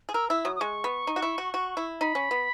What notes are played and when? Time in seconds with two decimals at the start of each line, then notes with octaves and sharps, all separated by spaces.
0.09 G#4
0.14 A#4 E6
0.29 E4 E6
0.45 F#3 D#6
0.56 D#6
0.61 G#3 C#6
0.84 B3
1.07 D#4
1.16 F#4
1.22 E4
1.38 F#4
1.54 F#4
1.77 E4
2.00 D#4 B5
2.15 C#4
2.31 B3